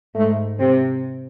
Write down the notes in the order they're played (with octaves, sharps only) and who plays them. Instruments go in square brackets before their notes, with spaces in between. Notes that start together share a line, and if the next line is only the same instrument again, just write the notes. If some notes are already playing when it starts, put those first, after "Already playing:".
[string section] G#2 [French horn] A3
[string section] C3 [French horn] C4